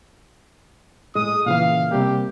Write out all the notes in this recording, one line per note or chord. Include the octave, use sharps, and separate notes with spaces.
A2 G#3 D#6
A#2 C#3 E3 F5
C3 G3 A#3 G4